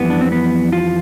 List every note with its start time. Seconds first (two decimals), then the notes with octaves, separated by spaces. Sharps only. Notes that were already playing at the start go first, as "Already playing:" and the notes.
Already playing: F2 E3 G3 B3
0.10 D4
0.21 C4
0.32 B3
0.72 F4